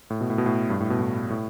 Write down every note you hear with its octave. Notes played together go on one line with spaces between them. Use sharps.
A2
B2
A2
B2
A2
G2
A2
B2
A2
A2